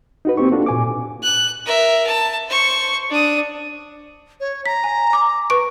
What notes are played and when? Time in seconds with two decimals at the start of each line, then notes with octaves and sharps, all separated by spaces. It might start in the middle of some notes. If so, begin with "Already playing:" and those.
0.25 D#4 F#4 B4
0.37 A#3 C4 G4 C#6
0.52 D4 F4 F#4 A4
0.66 A#2 G#5 D6
1.23 F#6
1.66 A#4 E5
2.07 A5
2.49 C5 C#6
3.10 D4 D#6
4.40 C#5
4.66 A#5 B6
4.84 G#5
5.13 D6
5.50 B4 C#6 D7